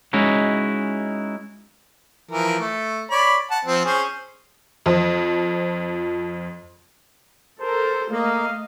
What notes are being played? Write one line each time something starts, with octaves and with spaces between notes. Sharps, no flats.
G#3 C#4 D#4 E4 F#4
E3 F3 A#4
A3
C#5 D5 B5
F#5 A5
F3 C4
C#4 G#4 C5
F2 F3
A4 A#4 C5
A3 A#3 D#5 F5